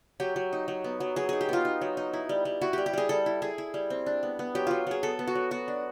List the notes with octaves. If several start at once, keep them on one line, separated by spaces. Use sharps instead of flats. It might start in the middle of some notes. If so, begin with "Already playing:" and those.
F#3 G4
F#3
D#4
F#3
B3
F#3
F#3 G#4
D#4 G#4
G4
B3 F4
D#4
F#3
D#4
E4
G3
G3
E4 F#4
G3 G4
G4
G3 G#4
G3 A4
E4
E4 G#4
E4
G3
C4
D4
B3
B3
F#3 G4
F#3 F4
F#3 G#4
B3 A4
B3
F#4
F#3
B3 F#4
D4